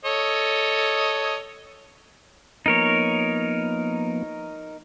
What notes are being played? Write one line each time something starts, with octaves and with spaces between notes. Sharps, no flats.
A4 C#5 D#5
F3 A#3 B3 D#4 A#4 C#5